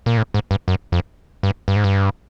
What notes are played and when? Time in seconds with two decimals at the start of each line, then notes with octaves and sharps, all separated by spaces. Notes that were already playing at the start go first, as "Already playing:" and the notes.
0.06 A#2
0.17 A2
0.34 G#2
0.51 G2
0.68 F#2
0.92 F2
1.43 G2
1.68 G2
1.76 G#2
1.84 G2